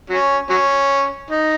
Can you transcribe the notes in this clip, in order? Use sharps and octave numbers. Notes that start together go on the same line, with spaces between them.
F#3 C#4
F#3 C#4
D#4